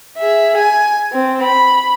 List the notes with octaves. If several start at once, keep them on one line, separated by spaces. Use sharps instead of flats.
G#4 E5
G#5
C4
B5